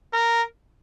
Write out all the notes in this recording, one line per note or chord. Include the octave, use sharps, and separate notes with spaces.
A#4